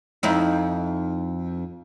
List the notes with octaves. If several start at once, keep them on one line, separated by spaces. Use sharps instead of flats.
F2 D#4 E4